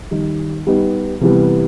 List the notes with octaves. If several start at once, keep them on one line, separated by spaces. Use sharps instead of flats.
D#3 G3 D#4
G3 B3 D#4 G4
C3 E3 G3 B3